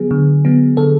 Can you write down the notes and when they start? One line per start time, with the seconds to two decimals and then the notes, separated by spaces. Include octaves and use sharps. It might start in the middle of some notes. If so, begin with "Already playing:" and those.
Already playing: D3 F#3 B3 G#4
0.11 D3
0.45 F#3 B3
0.77 D3 A4